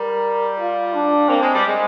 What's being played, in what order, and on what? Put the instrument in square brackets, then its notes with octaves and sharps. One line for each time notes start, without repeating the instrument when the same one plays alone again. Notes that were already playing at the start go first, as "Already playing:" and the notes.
Already playing: [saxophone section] G3 [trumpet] A#4
[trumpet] F4
D4
[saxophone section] A#3 [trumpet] C4
[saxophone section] G#3
G3
G#3